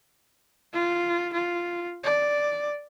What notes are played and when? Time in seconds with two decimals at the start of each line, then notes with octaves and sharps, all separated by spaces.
0.73 F4
1.33 F4
2.03 D5